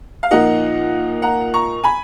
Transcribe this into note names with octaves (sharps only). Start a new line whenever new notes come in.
F5
A#2 F3 A#3 D#4 D#5 F#5
F#5 A#5
A#5 C#6
G#5 B5